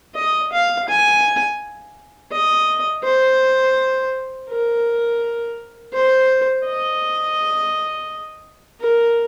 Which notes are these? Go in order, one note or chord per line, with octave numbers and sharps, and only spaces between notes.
D#5
F5
G#5
D#5
C5
A#4
C5
D#5
A#4